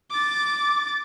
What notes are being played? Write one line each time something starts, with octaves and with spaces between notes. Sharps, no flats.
D6 A6